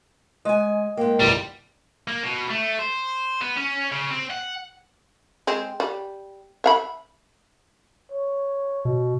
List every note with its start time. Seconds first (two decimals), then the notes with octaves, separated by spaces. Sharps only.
0.45 G#3 D#5 G#5
0.97 G#2 A#3 G5
1.20 G1 C2 G3
2.08 A#3
2.24 B2
2.50 A3
2.79 C5
3.41 B3
3.57 C#4
3.92 C#3
4.10 C4
4.30 F#5
5.47 G#3 C4
5.80 G3
6.64 E5 F5 B5
8.12 C#5
8.85 B2